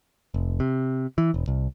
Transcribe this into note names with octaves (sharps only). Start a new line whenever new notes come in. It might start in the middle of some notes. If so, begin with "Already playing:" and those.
F1
C3
E3
E1
C2